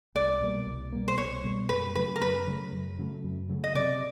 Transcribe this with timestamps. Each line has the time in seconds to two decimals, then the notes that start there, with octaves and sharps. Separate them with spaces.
0.15 C2 D5
0.41 B2 G3 A#3
0.67 C2
0.93 B2 G3 A#3
1.08 C5
1.18 C2 C#5
1.44 B2 G3 A#3
1.69 F#2 B4
1.95 C#3 F#3 A3 B4
2.16 A#4
2.21 F#2 B4
2.47 C#3 F#3 A3
2.72 F#2
2.99 C#3 F#3 A3
3.24 F#2
3.49 C#3 F#3 A3
3.64 D#5
3.75 C3 D5